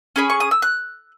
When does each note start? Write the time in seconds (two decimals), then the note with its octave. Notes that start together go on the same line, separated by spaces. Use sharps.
0.16 C#4 G#4 B5
0.30 C#6
0.40 D#6
0.51 E6
0.62 F#6